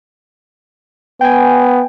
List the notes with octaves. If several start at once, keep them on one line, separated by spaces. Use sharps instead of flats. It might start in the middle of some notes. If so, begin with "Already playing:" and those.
B3 G5 G#5